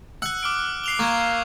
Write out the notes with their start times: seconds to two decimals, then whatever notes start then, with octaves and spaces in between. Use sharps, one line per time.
0.22 F#5 E6 F#6
0.43 D6 F6 D7
0.84 C7 F7 G7
0.99 A#3 C#6 D6 G#6